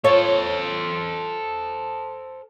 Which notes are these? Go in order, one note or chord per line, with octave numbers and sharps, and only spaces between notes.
F4 A4 C5 C#5